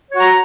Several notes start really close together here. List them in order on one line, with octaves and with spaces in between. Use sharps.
C#5 F#4 A#5